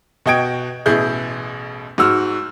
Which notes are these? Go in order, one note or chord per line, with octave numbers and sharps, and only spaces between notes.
B2 F#4 D#5 G5 G#6 D7
A1 B2 E4 G#4 G6
G#2 F#4 E6 F6